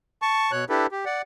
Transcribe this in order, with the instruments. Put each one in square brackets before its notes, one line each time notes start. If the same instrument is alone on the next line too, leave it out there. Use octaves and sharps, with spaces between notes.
[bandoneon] A5 C#6
B2 C#5 F#6
D4 E4 G4 A4 B4
G4
D5 F#5